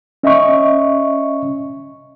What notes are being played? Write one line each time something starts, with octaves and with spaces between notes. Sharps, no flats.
C#4 D#5 E5 C#6